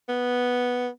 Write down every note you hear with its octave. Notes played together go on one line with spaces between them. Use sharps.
B3